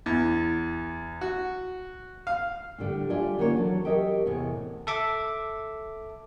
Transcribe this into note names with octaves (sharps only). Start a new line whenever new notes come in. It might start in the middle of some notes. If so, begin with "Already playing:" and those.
E2
F#4
F5
A2 D3 G3 A3 C#4
G3 A3 F4 D5 E5 G#5
D3 D#3 A#3 C#4 E4 C#5
E3 F#3 A4
G4 A#4 C#5 D#5 E5 G5
E2 A2 C3 C#5
A4 E5 D6